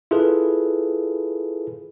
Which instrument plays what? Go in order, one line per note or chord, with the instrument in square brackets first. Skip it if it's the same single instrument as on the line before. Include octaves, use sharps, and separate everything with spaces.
[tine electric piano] E4 F4 G#4 A4 B4